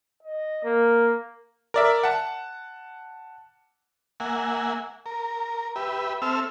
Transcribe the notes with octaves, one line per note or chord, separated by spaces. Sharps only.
D#5
A#3
A#4 D5 E5
F#5 A5
A#3 E5 F#5 G#5
A#4
G4 B4 E5
C4 A4 E5 E6 F6